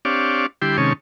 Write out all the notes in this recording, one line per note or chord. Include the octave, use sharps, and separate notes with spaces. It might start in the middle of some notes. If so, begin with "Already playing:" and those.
C4 D4 G4 C#5 D5 F5
D3 G3 E4 G4 G5 C6
C3 D#3 G#3 C#4 C#5 A5